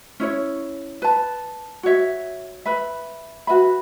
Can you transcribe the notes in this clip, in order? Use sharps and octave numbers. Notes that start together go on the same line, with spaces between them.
C#4 E4 C#5
B4 A5
F#4 C#5 E5
B4 E5 B5
F#4 B4 E5 B5